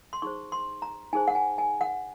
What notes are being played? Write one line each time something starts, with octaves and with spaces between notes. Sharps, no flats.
C6
D#4 G#4 C5 C#6
C6
A#5
D#4 G#4 C5 G#5
F#5
G#5
G#5
F#5